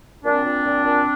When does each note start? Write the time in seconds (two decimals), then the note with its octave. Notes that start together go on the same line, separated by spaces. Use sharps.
0.25 A#2 C4 D4
0.45 A#2
0.65 A#2
0.85 A#2